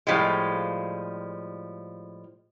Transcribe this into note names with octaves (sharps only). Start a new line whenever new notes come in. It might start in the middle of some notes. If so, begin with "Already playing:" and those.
A2 F3 G3 G#3